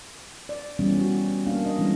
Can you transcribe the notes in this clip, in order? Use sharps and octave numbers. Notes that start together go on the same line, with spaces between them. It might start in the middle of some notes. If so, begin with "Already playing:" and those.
D5
E3 G3 B3 C#4
F#4
A#3 D4 F5
D#5
E3 G3 G#3 B3 C#4